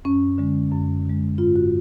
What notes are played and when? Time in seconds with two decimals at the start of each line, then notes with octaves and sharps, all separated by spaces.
0.05 F#2 C#4
0.38 D3 G#3
0.72 F#2
1.05 D3 G#3
1.38 G#2 F4
1.56 F#4